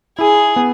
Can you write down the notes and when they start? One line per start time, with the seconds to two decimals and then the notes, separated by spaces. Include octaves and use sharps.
0.19 E4 G#4
0.56 B3